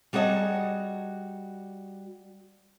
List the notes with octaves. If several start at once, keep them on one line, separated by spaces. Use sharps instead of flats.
G3 F#4 G#4 A#4 D#5 A5